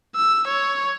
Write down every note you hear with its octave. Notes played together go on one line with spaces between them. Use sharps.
E6
C#5